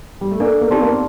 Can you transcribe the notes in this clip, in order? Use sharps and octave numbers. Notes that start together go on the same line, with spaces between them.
G3
A3
A#3 D4 A4 D5
A#3
C4 D#4 G4 D5 A5 C6
A#3
C4